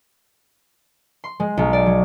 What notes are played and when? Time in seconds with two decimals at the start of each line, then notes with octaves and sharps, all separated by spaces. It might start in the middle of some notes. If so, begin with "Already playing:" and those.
1.24 C6
1.40 G#3
1.57 B1
1.73 D5
1.86 F#3